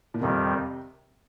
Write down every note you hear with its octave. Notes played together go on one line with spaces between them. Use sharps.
A#2
F2 C3 D#3 G3